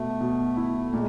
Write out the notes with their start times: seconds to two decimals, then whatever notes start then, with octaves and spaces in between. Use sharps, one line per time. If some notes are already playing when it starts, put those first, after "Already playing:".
Already playing: B2 A3
0.21 B2
0.57 E4
0.93 A#2 G#3